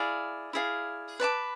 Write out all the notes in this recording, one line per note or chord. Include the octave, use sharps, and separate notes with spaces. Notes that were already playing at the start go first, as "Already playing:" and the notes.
Already playing: E4 G#4 D5 F5
E4 G#4 D5 F5
B4 D5 A5 D6